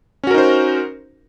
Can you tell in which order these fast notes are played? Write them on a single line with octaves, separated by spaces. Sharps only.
C#4 F#4 A#4 D#4 C5